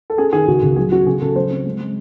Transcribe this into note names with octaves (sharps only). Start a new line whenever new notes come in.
A4
C#4 G#4
D#3 G#4
C#2 F#4
C#2
F#3 G#4
C#4 F#4
C#3 G#4
C#3 A4
F#3 C5
C4
G#3
G#3